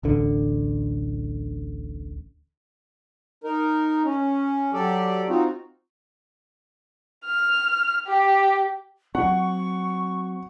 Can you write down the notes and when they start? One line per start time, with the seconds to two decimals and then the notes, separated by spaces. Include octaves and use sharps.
0.03 D1 A1 D3
3.44 D#4 A#4
4.05 C#4
4.73 F#3 G4 A4 D5
5.29 C4 D#4 F4 F#4
7.25 F6
8.06 G4
9.15 F#3 C4 F#5 C#6